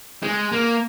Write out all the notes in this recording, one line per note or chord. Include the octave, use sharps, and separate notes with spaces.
G#3
A#3